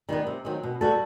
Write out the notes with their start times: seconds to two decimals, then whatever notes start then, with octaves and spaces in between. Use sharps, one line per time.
0.09 D#3 G3 B3
0.27 C3
0.45 D#3 F#3 C4
0.63 B2
0.81 G3 B3 F#4 A4